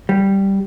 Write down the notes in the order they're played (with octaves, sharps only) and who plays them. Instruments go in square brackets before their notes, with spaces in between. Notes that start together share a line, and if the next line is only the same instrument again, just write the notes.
[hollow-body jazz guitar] G3